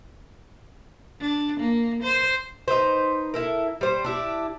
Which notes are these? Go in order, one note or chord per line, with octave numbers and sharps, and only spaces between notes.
D4
A#3
C5
D#4 E4 B4 C5
E4 A4 A#4
G3 C5
D4 E4 G4